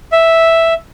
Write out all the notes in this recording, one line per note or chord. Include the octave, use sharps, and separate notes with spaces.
E5